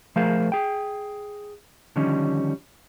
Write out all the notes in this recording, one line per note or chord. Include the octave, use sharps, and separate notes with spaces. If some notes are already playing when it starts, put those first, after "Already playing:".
F3 A3 G#4 A#4 C5 F5
G#4 G5
D3 D#3 F3 G3 C#4 D#4